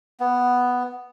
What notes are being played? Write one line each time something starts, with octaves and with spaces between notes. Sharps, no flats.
B3